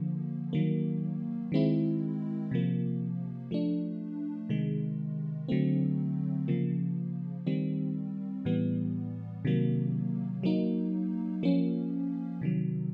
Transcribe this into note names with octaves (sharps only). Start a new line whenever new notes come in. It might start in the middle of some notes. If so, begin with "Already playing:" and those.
Already playing: D3 F3 A#3
D#3 F#3 A#3
D#3 G#3 C4 E4
C3 F3 A#3
F3 A3 D4
C3 D#3 G#3
D3 F#3 A3 C4
C#3 F3 A#3
D#3 G3 C4
A2 E3 G3 B3
C3 D#3 F#3 A#3
F#3 A#3 D#4
F3 A#3 C#4
C3 D#3 F#3